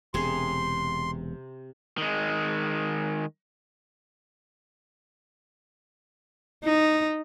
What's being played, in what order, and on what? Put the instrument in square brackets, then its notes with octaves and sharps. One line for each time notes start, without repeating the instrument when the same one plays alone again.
[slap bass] E1 [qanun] C3 G#4 [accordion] C6
[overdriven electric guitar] D#3 G#3
[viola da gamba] D#4